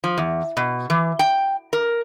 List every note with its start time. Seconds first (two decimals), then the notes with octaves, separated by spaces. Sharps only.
0.04 F3
0.18 E2
0.57 B2
0.90 E3
1.19 G5
1.73 A#4